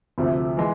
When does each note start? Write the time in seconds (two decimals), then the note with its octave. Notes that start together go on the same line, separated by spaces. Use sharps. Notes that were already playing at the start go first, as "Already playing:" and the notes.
0.18 D2 C3 F3 A3
0.57 E3 G#3